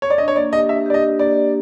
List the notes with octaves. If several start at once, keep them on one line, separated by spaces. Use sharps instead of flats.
C#5
D5
D4 D#5
C#5
A#3 D5
G4 D#5
D4 E5
G4 D5
D#5
D4
A#3 D5
G4